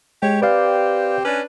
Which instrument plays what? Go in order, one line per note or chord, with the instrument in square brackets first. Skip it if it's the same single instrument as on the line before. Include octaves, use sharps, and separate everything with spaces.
[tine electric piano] G#3 [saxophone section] G4 C#5
[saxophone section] C4 G4 [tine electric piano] B4 D5 F5
[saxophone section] C#4 D4 B4